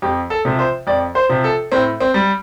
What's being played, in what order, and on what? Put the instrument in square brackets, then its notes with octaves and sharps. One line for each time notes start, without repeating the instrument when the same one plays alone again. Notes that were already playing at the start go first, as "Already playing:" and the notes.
[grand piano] F2 G4
A4
C3 F3
C5
F2 D5
C5
C3 F3
A4
A2 C4
C4
G3